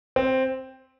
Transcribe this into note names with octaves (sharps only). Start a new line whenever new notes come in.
C4